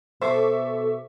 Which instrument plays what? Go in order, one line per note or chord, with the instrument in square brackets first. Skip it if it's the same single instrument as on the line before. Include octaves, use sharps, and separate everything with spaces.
[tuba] B2 [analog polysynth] A4 [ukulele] C5 [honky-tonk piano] E5 C#6 D6